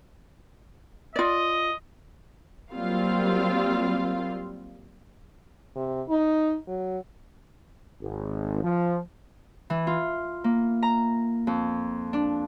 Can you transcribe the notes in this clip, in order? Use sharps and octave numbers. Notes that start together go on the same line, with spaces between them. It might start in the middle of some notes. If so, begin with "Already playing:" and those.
F4 D5 D#5
F#3 G3 A#3 C4 F4 F5
C3
D#4
F#3
G#1
F3
E3
F4
A#3
A#5
F2
D4